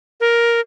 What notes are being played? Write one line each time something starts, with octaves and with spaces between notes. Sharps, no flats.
A#4